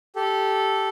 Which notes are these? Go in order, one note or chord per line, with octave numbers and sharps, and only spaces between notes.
G4 A4